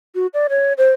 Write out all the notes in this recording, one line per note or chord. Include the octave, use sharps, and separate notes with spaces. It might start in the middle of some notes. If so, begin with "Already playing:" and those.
F#4
D5
C#5
C5